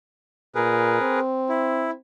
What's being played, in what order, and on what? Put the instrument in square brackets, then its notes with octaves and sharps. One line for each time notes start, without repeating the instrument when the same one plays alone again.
[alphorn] A#2 [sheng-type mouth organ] G#4 A#4 B4
[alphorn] C4
[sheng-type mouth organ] E4